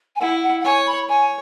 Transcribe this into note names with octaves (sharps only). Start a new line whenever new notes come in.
G#5
E4 F#5
F#5
F#5
C#5 G#5
B5
C#5 G#5